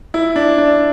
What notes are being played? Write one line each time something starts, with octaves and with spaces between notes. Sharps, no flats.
E4
D4
D4